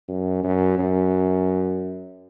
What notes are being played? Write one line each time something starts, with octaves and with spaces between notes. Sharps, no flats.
F#2
F#2
F#2